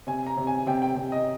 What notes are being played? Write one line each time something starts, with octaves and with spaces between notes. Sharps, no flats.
C3 G#5
A#5
C3
G#5
C3 G5
G5
C3
D#5